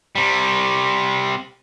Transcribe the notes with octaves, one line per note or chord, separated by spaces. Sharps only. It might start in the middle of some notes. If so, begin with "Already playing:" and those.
C3 G3